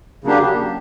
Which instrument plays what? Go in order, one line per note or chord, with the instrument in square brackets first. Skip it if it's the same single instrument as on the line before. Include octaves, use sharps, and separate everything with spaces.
[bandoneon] C#3 F#3 A#3 D4 G4